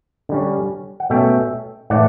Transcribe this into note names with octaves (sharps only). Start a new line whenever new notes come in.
D3 G3 C#4
F#5
B2 A3 C#4 E5 G5
A2 E3 A3 D5 F#5